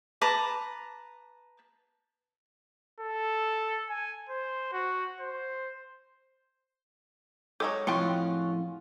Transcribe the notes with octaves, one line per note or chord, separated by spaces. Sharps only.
B4 A5 A#5 D6
A4
G#5
C5
F#4
C5
F#3 G#3 A4 C#5 D6 G6
F2 A2 C#4 F4 F#4 G5 C6 C#7